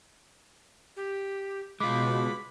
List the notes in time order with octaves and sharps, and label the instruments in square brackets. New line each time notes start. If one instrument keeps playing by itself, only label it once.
[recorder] G4
[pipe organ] B2 [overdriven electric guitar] G#3 F4 [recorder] B5 [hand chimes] D6